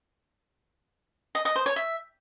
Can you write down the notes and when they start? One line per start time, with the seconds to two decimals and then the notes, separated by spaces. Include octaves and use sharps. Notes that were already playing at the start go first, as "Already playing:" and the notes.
1.35 D#5
1.45 D#5
1.56 C5
1.66 C#5
1.76 E5